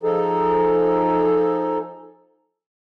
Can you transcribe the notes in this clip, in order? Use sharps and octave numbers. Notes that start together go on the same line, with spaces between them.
F3 D#4 G#4 A4